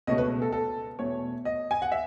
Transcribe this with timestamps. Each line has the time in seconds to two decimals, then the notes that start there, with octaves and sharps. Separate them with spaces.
0.07 C#2 B2 A3 C#4 D#5
0.18 B4
0.42 A4
0.52 A4
0.99 E2 B2 A3 C#5
1.45 D#5
1.71 G#5
1.82 F#5
1.92 E5